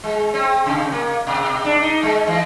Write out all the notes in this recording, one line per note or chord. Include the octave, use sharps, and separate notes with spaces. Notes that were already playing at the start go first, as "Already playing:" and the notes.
G#3
C4
C3
A#3
B2
D4
D#4
G#3
E3